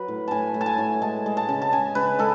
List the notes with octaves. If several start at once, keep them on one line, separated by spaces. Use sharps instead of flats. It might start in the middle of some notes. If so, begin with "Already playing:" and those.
Already playing: F#3 B4
A2
A2 G#5 A5
A3
A5
G#5
A2
G#3 A5
G#3
A5
C#3
A5
C#3 G#5
C#3 B4
G#3 A4